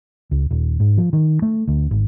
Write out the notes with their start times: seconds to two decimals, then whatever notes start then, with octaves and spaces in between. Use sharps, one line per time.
0.31 C#2
0.51 D#1
0.80 G#2
0.98 F3
1.13 D#3
1.42 A3
1.68 D2
1.91 G#1